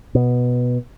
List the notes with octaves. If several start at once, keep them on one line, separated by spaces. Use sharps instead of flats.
B2